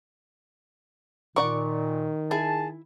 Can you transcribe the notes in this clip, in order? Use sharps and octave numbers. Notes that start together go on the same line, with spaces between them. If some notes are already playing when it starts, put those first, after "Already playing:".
A#2 D#3 A#4 D5 F#5 C#6
E4 G#4 A5